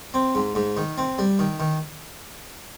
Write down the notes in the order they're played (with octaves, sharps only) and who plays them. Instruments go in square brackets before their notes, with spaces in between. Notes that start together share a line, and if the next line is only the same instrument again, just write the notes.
[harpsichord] C4
G#2
G#2
D#3
C4
G3
D#3
D#3